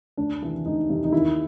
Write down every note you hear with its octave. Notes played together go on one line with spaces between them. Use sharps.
D2 D4
C3 E3
D2 D#4
C3 E3
D#4
D#2 E4